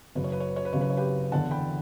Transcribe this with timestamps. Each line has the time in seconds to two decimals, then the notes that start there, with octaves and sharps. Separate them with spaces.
0.15 F#1 F#2 C#3 B4
0.24 C#5
0.32 B4
0.40 C#5
0.49 B4
0.56 C#5
0.65 B4
0.73 F#1 F#2 C#3 C#5
0.81 B4
0.90 C#5
0.97 G4 B4
1.32 E1 E2 D3 F#5 A5
1.51 G5 B5